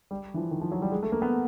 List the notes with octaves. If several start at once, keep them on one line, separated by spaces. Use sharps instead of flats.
G3
E3
F3
D#3
F3
F#3
G3
G#3
A3
A#3
B3